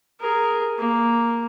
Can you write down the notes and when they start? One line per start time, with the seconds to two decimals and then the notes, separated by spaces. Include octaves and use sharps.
0.20 G#4 A#4
0.78 A#3